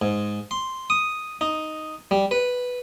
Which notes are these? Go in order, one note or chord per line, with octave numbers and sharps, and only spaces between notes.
G#2
C6
D#6
D#4
G3
B4